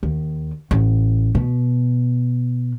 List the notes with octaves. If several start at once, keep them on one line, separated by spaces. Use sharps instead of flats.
D#2
A1
B2